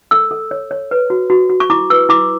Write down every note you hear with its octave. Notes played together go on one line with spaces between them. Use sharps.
A4 E6
A4
C#5
C#5
B4
F#4
F#4
F#4
C#6
E4 D6
B4 E6
E4 D6